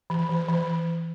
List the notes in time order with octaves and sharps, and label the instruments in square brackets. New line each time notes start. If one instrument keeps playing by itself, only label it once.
[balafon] E3
E3
E3